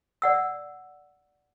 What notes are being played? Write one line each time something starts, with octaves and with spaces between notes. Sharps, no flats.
D5 F#5 E6